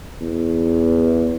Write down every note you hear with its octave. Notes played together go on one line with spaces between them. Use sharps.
E2